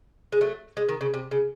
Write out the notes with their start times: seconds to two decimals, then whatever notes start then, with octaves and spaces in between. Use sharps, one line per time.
0.32 G#3
0.41 F#3 A3
0.77 G#3
0.89 D#3
1.01 C#3
1.14 C3
1.31 C#3